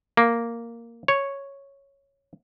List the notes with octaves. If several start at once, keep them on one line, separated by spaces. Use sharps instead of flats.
A#3
C#5